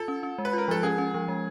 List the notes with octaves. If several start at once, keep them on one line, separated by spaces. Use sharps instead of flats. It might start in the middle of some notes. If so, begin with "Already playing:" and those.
Already playing: F4 A4
C#4
C#4
G#3
B4
F4 A#4
F3 A4
C#4 G#4
C#4
F3
G#3